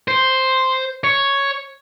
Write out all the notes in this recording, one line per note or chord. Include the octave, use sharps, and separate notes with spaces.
C5
C#5